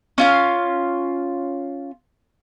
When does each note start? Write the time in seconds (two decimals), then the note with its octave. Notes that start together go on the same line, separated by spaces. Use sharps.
0.18 C#4 F4 F5